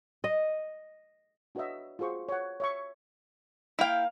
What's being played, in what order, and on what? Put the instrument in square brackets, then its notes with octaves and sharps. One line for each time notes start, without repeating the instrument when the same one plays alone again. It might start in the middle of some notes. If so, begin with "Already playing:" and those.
[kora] D#5
[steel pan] D4 F#4 B4 C#5 D#5 E5
F4 F#4 G#4 C5 C#6
C#5 F#5
C#5 E5 C#6
[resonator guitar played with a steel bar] A#3 F5 [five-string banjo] E4 G5